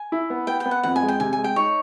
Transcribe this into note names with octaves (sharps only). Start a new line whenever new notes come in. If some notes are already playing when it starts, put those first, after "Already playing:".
Already playing: G#5
E4
B3
B3 G5
G5
B3
F#5
F2 F#5
G#5
G#3
G5
C3 G#5
G#5
G#3
G5
D#4 C#5